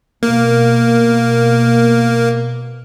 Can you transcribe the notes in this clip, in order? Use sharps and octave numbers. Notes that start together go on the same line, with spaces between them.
B2 A#3